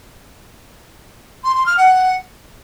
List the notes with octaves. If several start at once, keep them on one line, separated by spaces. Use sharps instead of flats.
C6
C6
F6
F#5